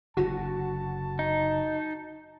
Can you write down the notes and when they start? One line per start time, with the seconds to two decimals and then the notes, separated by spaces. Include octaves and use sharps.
0.17 F#1 D3 F#4 A5
1.19 D#4